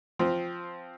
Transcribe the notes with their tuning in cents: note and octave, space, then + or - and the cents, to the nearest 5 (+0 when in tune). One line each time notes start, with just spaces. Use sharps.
F3 +0 C4 +0